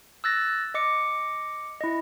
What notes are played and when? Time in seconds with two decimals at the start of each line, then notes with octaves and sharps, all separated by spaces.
0.24 E6 F#6 A6 A#6
0.74 D#5 D6 C#7
1.81 E4 D#5